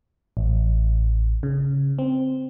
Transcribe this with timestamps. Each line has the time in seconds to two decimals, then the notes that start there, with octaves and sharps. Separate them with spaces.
0.37 A1
1.43 C#3
1.99 C4